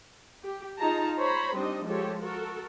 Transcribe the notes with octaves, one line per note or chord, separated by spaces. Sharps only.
G4
D#4 F4 G#4 A5 A#5
C5 C#5 A#5 B5
G3 C4 D4 D#4 D#5
F3 G#3 G4 A4 C#5
F#4 A4 A#4